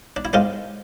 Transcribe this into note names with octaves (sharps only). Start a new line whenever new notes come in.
D4
E4
G#2 G#3 D4 F4